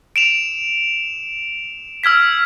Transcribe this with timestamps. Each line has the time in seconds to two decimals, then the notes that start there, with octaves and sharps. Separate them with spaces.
0.16 D7 E7 F7
2.04 E6 F6 G#6 B6